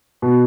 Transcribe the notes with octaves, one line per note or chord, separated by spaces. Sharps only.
B2